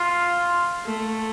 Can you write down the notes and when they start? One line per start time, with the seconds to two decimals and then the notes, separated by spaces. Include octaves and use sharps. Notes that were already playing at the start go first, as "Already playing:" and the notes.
Already playing: F4
0.85 A3